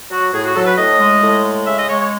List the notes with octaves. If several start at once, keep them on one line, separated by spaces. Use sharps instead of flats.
F#3 F#4
A2 G#4
F#4
F#3 A4
B4
A2 D#5
G#3
A2
G#3
C#3 E5
D#5
G#3 C#5
C#5